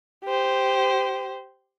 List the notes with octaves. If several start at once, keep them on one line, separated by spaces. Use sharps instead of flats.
G4 C5